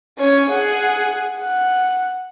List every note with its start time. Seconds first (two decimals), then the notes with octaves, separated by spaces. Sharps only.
0.19 C#4 C#5
0.50 G#4 F#5
1.38 F#5